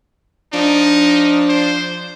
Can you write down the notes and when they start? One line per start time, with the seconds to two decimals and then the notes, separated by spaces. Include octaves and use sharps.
0.53 F3 D4 D#4
1.49 C5